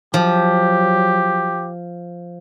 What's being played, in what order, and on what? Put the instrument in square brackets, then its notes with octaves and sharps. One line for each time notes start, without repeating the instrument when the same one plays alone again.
[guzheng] F3 [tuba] F#3 [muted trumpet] G4